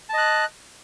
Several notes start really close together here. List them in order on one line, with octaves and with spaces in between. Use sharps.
A5 D#5 F#6